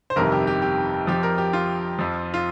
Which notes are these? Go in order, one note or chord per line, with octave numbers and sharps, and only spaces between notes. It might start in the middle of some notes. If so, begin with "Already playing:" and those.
C5
G1 F2 C3 D#3 G3 A#4
G4
G4
G4
F2 F3 G4
A#4
G4
F4
F2 F3
F4